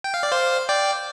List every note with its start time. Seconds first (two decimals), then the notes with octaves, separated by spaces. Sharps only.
0.04 G5
0.14 F5
0.23 D5
0.32 C5 F5
0.69 D5 G5